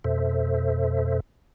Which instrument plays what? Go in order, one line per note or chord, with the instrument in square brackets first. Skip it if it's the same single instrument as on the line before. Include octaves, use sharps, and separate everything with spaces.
[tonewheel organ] F2 B2 A4 C5 E5